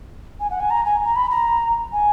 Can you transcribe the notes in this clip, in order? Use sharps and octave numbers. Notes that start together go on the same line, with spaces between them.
G#5
F#5
G#5
A#5
G#5
A#5
B5
A#5
G#5